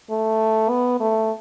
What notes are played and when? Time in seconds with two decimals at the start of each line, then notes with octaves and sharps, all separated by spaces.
0.10 A3
0.70 B3
1.00 A3